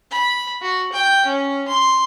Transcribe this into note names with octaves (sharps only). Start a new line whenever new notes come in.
B5
F#4
G5
C#4
C6